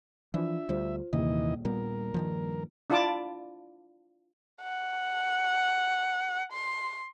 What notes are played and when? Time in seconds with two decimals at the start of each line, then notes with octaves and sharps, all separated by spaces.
0.34 E3 F3 D4 F4 E5
0.69 D2 G3 F4 C5
1.13 D#1 A#1 D#2 C3 E3 D#5
1.65 A#2 G3 B3 A#4
2.14 G2 D#3 F3
2.90 D4 E4 F4 D5 A5 D6
4.62 F#5
6.53 C6